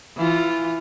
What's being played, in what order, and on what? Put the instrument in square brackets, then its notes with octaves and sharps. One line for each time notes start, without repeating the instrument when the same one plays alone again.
[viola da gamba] E3 F4